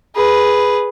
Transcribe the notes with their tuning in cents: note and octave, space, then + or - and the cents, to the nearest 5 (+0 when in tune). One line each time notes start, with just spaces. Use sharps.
G#4 +0 B4 +0